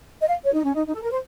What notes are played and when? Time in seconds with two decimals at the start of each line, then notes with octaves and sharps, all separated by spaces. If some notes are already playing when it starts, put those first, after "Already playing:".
0.21 D#5
0.28 F5
0.45 C#5
0.54 D#4
0.64 C#4
0.75 D#4
0.86 D#4
0.95 A4
1.03 A#4
1.11 C5